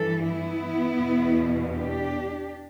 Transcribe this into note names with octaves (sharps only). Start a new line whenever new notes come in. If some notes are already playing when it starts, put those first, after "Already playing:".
Already playing: G2 E3 A4
B3 E4
E2 B2
D4 G4